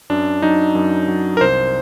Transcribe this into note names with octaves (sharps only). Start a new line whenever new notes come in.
F#2 D4
F#3 D#4
F#2
F#3
A#4
C2 C5